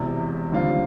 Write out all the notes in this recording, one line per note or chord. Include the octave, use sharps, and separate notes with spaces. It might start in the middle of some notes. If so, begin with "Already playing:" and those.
Already playing: E1 E2 C3 E3
D#2 D3 G3 C4 F4